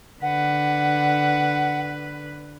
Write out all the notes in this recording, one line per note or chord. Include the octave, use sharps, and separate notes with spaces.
D3 B4 F#5